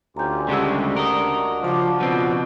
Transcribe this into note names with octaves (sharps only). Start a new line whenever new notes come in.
D2 C#4 F4 G4 A#5 G6
C#3 G3 G#3 D4 F#4 G4 E6
A#4 D#5
C#3 F3 A5 D6
B2 F3 C4